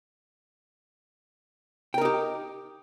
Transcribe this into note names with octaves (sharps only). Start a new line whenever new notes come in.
D#4 G4 A#4 G5